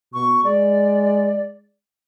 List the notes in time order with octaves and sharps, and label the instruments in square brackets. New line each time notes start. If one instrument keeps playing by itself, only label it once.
[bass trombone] B2 [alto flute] C#6
[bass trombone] G#3 [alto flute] D5